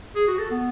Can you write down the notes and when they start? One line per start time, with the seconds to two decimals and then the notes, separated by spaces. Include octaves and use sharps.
0.16 G#4
0.27 F#4
0.39 A4
0.51 B3